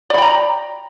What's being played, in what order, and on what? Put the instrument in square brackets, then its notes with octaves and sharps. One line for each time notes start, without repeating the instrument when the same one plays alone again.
[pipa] D5
B5
G5
A#5